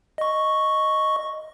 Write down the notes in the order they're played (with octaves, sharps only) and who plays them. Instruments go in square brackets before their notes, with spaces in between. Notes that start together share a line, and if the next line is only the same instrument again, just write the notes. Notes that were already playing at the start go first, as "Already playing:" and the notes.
[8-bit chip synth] D#5 C#6